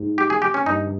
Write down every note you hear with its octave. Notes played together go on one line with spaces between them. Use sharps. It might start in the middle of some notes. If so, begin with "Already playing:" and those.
Already playing: G#2
G4
G#4
G4
C#4
G2 D#4